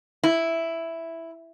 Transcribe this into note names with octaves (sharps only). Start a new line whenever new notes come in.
E4